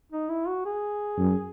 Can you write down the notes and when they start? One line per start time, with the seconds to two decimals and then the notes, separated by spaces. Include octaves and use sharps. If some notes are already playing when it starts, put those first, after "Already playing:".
0.12 D#4
0.29 E4
0.48 F#4
0.66 G#4
1.18 F#2